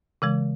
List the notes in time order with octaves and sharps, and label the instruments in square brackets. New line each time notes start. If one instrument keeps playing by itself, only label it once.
[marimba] C#3 E3 G#3